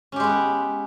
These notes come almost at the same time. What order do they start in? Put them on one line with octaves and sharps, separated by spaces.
C#4 G4 G#3 B3